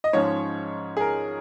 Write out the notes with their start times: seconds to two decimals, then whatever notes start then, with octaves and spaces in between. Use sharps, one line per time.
0.04 D#5
0.13 G#2 F3 G#3 C#4 C#5
0.97 G#4
1.01 A#4